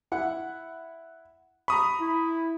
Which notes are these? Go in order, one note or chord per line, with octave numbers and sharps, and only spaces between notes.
E4 F#5
A#5 B5 C#6 D#6
E4